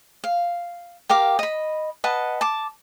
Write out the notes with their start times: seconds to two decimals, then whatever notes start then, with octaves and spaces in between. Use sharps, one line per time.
0.24 F5
1.09 G4 A#4 F5 D6
1.39 D#5 B5
2.04 B4 D#5 F#5 A5
2.41 A5 D6